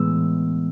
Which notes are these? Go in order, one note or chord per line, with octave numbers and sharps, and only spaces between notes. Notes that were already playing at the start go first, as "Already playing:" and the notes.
Already playing: A2 E3 G#3 B3 E6